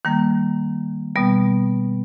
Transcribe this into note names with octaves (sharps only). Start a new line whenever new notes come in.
D#3 G3 A#3
B2 G3 B3